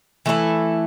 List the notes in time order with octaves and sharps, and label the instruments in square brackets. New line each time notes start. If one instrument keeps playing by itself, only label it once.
[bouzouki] E3 A3 E4 A4